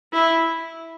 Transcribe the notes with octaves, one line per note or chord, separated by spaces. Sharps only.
E4